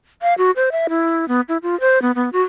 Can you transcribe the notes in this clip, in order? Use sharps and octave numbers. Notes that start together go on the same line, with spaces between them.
F5
F#4
C5
E5
E4
B3
E4
F4
C5
B3
B3
F#4